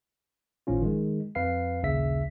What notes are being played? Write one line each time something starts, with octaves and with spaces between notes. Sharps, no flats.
G#1 A2 F3 C#4 F4
D#3 G#3
F2 B4 F5 C7
A#1 D#2 C#3 E5 B6